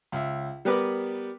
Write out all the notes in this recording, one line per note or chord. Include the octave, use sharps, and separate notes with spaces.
C#2 E5
G3 B3 A#4 B4 D6